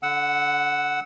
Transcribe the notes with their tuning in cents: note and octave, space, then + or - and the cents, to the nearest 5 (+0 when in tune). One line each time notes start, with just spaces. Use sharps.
D3 -25 F#5 +0 E6 -15